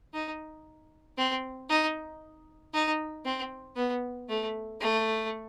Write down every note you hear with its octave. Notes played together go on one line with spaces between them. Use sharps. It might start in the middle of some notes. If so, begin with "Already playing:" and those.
D#4
C4
D#4
D#4
C4
B3
A3
A3